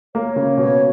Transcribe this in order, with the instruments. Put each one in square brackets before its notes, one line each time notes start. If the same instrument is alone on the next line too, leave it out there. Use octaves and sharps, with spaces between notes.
[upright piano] A#3 [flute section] C#5
[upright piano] C#3
[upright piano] B2 [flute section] C#5